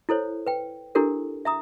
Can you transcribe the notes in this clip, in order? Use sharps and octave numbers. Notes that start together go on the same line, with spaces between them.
E4 A4 C5 C#5
B4 G5
D4 E4 G4 A4 A#4
E5 A#5 D#6